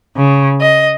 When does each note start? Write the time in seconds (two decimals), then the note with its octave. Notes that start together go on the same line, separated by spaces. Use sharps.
0.16 C#3
0.60 D#5